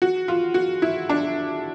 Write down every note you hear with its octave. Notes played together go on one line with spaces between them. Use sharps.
F#4
F4
F#4
E4
D4